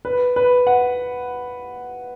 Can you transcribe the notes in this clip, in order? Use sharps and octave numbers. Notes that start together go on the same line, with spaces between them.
B4
B4
F#5